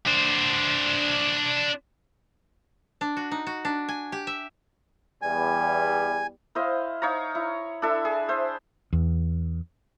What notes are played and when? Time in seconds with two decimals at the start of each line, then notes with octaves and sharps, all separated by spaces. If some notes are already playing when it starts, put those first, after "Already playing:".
0.07 D4 C5
3.01 D4
3.17 F#4
3.31 D#4
3.47 F#4
3.65 D4
3.89 G#5
4.12 G4
4.27 E5
5.22 E2 G3 G#5
6.55 E4 C5 D#5 F5
7.02 D#4 C#5 F5 A#5
7.35 E4
7.82 D4 E4 A4 E5
8.05 G#4
8.28 C5 E5
8.93 E2